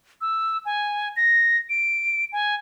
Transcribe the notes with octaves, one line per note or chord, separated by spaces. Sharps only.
E6
G#5
A#6
D7
G#5